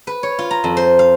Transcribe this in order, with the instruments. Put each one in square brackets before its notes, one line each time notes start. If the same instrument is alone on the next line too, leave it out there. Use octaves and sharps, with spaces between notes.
[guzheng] B4
C#5
F4
A#5
F2
C5
F5